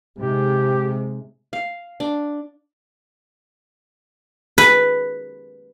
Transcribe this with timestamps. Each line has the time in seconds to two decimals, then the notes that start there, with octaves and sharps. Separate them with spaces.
0.18 G#2 C3 G#3 G4
1.53 F5
2.00 D4
4.58 B4